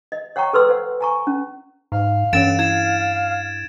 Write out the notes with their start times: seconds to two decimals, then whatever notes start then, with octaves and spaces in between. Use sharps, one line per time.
0.12 D#5
0.36 C#5 F#5 G5 A#5 C#6
0.53 A4 B4 C6 E6
0.69 C5 F#5
1.01 G#5 A#5 C#6
1.27 C#4
1.92 G#2 F5
2.33 G2 E3 C#4 C#5 A6 D7 E7
2.59 E4 G#6 E7